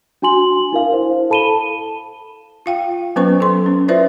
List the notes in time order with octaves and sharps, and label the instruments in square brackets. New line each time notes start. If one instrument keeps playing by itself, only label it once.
[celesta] D4 F#4 G#5 C6 F#7
E4 A#4 F5
E4 C5
A4 A5 B5 D#7 E7 G7
[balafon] F4 F5 G5
F#3 B3 C#4 B4 C5 C#6
A4 C6
C#4
E4 F4 B4 C5 D5 E5